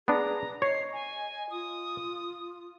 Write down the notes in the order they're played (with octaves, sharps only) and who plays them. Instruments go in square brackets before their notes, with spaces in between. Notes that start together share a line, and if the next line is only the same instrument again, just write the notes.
[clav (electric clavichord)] B3 D4 [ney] G#4 [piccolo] A#5
[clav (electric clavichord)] C#5 [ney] D#5 [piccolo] C7
[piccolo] G#5
[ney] F4 [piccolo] D#6